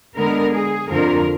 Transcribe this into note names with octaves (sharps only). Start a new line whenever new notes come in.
D3 G#3 B3 A#4
G#4
F2 D3 F3 A#4